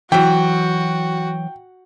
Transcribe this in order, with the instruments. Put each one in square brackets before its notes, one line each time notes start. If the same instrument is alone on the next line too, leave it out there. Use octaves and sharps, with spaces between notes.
[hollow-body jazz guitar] E3 F#3 [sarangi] F#4 [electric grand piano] G5